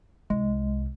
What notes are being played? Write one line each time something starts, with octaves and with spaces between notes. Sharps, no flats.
C2 G#3